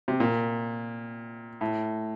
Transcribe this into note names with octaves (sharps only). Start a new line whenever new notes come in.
C3
A#2
A2